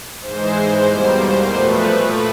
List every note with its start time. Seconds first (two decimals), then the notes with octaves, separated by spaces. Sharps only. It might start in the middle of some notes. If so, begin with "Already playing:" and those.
0.21 G#2 E3 G#3 C5
0.85 E2 B2 G3 A#3
1.50 A#2 F3 A3 B4